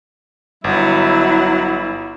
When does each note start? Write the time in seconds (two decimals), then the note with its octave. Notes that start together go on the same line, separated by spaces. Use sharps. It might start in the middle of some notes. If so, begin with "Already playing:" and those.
0.64 G1 F#3 E4